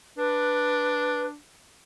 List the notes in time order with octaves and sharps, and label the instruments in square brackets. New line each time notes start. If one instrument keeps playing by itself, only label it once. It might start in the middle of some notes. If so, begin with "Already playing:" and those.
[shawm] D4 [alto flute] B4